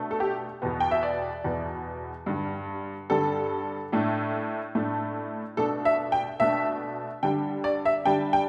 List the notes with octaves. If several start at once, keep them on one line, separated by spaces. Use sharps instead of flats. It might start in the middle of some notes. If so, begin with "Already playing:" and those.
Already playing: B2 A3 D4
A4
G4
E2 B2 B3
G5
E5
D5
E2 B2 B3
G2 D3 G3
G2 D3 G3 A4
A2 A3 D4
A2 A3 D4
B2 A3 D4 A4
E5
G5
B2 A3 D4 E5
D3 G3 D4 G5
D5
E5
D3 G3 D4 G5
G5